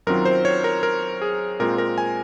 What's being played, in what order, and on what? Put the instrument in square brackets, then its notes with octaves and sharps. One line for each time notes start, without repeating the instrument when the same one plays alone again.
[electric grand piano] F#2 D#3 F#3 C4 F4 A#4
C5
C#5
A#4
A#4
G#4
A#2 G#3 C4 F4 A#4
A#4
G#5